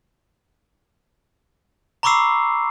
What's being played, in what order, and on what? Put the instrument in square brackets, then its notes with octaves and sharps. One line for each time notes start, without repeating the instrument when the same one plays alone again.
[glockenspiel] A#5 B5 C#6 D6 E6 C7